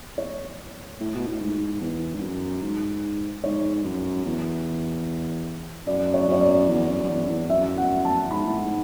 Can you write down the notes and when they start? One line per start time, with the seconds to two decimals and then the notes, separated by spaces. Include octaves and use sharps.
0.18 C#5
1.00 A2
1.15 B2
1.27 A2
1.40 G#2
1.81 E2
2.15 G#2
2.21 F#2
2.62 G#2
3.44 G#2 C#5
3.84 F#2
4.25 E2
5.87 F#2 D5
6.14 C#5
6.22 D5
6.28 F#2 C#5
6.41 D5
6.68 E2
6.89 F#2
7.04 F#2
7.10 E2
7.25 F#2
7.30 E2
7.49 F#2 E5
7.77 F#5
8.05 A5
8.31 G#2 B5
8.44 A2
8.58 G#2